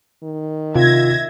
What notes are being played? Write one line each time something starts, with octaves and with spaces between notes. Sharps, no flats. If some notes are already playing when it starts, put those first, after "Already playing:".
D#3
C3 F4 E5 G#6 A#6